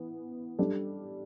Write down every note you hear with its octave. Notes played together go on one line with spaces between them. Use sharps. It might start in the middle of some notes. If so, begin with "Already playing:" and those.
Already playing: E3 B3
G3 D4 A4